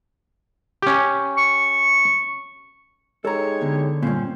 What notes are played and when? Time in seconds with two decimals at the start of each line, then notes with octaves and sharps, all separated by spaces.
0.82 C#4 G4
1.37 C#6
3.25 G#3 D#4 G4 A4 C#5 A#5
3.61 D3 B3
4.03 G2 A#2 C4 C#4